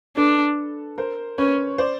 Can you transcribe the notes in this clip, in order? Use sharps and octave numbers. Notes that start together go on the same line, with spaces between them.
D4 A4 B4
A#4 C5
C#4 B4 C#5
C5 D5